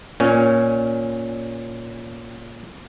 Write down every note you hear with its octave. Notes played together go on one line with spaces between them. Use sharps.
A#2 C#4